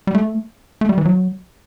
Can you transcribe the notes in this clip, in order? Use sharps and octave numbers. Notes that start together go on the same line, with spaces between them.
G3
A3
A3
G3
E3
F#3